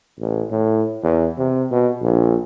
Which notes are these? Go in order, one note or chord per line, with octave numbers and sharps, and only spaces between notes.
A1
A2
E2
C3
B2
A#1